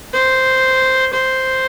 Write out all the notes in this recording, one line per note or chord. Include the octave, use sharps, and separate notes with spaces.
C5
C5